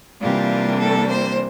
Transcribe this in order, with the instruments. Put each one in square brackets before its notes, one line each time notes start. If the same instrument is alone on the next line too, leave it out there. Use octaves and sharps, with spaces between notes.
[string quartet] C3 E3 G3 A#3 D4 F4
A4
C5